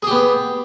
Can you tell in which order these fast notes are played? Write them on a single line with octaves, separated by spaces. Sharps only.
G#4 G4 B3